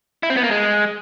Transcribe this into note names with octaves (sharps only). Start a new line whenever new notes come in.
E4
C4
B3
A#3
G#3